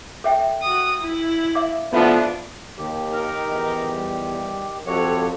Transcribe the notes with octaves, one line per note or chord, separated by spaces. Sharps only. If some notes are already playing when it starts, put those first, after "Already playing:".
A4 E5 G5
F#4 D#6
E4
E5 F5 D6
F3 A3 B3 D4 E4 F4 E5
D#2 D#3 G4
D#4 A#4
E2
G3
F2 F#3 C4 G4 A4 C#5